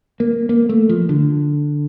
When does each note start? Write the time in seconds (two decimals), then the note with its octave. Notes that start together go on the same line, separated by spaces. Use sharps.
0.20 A#3
0.49 A#3
0.69 A3
0.89 F3
1.09 D3